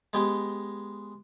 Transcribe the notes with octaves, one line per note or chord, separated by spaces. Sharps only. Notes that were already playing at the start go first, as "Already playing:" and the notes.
G#3 B3 G4 D#5